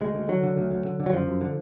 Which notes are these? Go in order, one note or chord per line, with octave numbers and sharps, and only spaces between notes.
D2 G#3
D2
D3 F#3
D3
D2
D2
D3
D3
F#3
F#2 F3
F#2
D3